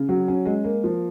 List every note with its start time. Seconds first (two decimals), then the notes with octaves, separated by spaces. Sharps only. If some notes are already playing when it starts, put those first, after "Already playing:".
Already playing: C#3
0.09 F#3
0.28 C#4
0.46 G#3
0.64 A#3
0.84 F3